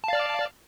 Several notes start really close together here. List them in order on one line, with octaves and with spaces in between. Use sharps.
A5 F5 D5